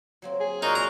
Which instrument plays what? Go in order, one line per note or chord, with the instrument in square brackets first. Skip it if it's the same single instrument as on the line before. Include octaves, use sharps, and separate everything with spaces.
[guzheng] F#3 A#3 C4
[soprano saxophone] G#4
[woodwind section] A#2 F#4 A#4 [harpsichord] D#4
[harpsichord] A#5